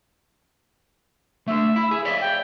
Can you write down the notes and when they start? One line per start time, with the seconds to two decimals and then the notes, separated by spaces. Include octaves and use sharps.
1.48 A3 D4 E5
1.76 E4
1.91 G#4
2.05 C#5 D5 E5 B6
2.20 G5